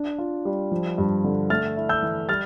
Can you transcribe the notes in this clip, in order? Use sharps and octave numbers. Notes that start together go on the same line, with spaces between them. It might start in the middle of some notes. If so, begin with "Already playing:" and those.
Already playing: D4
F4
G3
F3
G2
D3
A3 F6 A6
E4
E6 G6
E3
G3 F6 A6